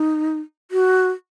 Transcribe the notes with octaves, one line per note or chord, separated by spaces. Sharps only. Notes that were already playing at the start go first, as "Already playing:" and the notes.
Already playing: D#4
F#4